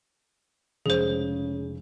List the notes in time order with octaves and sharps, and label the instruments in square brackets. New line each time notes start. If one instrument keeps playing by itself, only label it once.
[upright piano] F1 G#3 [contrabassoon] C#3 [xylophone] G#4 C5